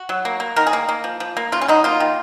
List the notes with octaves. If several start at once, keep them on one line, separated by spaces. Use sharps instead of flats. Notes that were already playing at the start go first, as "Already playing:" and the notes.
Already playing: F#4
F#3
A#3
A#3
D#3 A#4
G#4
A#3
A#3
F3
F3
A#3
C#3 F4
C#4
F#3 D#4
A#3 F4
D#3